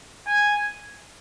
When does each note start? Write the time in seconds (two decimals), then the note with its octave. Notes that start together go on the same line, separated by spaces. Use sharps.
0.27 G#5